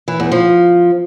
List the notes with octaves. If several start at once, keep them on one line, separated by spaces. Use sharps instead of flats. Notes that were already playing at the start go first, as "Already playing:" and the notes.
E3
E2
F3